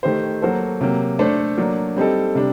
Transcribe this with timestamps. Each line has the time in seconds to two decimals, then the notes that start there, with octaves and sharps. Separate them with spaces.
0.03 D#3 A3 D#4 G4 C5
0.42 F#3 A#3 F#4 A4 C5
0.81 C3 F#3 A#3
1.19 A3 D4 A4 C5
1.58 F#3 A#3 D4
1.97 G3 C4 D#4 A4
2.35 C3 G3 D4